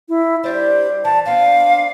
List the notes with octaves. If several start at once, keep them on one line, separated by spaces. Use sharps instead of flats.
E4
G3 D4 G4 C5
E3 A5
B3 C4 D4 F5